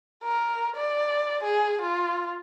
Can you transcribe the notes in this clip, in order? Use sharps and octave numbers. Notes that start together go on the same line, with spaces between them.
A#4
D5
G#4
F4